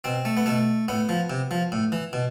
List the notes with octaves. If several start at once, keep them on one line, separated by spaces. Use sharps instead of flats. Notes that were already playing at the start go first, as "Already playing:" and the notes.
B2 C4
A3
B3
B2 A3
A2 B3
F3
C3
F3
A2
E3
B2